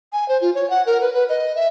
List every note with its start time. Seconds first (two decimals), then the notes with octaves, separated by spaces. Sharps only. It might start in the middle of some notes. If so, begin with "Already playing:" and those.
0.13 G#5
0.29 C5
0.41 F4
0.55 C#5
0.70 F#5
0.86 A#4
1.01 B4
1.14 B4
1.29 D#5
1.56 E5